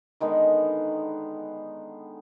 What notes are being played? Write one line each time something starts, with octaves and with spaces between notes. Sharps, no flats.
D3 D#3 G#3 B3